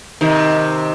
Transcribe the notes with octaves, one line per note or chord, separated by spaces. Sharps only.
C3 D#3